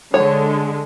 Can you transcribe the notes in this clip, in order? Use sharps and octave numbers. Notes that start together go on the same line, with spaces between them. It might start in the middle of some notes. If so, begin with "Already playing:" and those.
D3 G#3 C#5